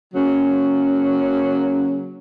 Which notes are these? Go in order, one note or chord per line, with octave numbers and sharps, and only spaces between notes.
C#3 F#3 A#3 C#4